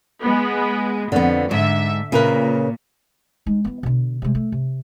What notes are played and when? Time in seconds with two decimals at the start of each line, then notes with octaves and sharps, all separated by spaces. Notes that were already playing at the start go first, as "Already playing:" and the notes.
0.22 G#3 B3
1.12 F2 D3 B3
1.51 G#2 D3 E5
2.12 A#2 C#3 A#4 B4
3.46 G#3 D#4
3.65 E3 B3
3.83 B2 D3
4.22 C3 G#3
4.35 A3
4.52 C3